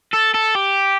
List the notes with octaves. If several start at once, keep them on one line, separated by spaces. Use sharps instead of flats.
A4
A4
G4